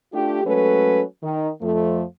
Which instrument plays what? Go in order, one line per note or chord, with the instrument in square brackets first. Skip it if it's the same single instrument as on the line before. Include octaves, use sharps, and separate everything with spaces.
[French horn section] A3 D4 F4 G4
F#3 G#3 A3 C#4 A4 B4
D#3
F2 F3 A3